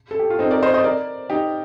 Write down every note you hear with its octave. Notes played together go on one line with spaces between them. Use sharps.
A4
G4
F4
C4 D#4
A#4 D5
C5 D#5
C5 D#5
A#4 D5
D#4 G4